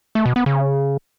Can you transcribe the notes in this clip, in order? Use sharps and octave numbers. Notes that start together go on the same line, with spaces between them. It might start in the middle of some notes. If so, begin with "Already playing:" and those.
A3
B2
B3
C#3